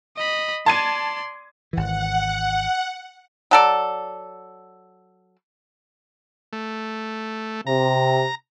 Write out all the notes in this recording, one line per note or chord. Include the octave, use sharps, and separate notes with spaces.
D#5 B5
D5 A5 C6 G#6 D#7
G#1 E3 F#5
F#3 A4 D5
A3
C3 A#5